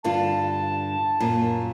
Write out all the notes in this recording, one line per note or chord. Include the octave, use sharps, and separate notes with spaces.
G2 D3 F4 A5
F#2 A#2